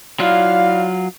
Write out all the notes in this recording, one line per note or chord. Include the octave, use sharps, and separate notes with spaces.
F#3 E4 F4 D5 F5